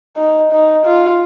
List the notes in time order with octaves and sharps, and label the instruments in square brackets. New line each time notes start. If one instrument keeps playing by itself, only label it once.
[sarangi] D#4
D#4
F4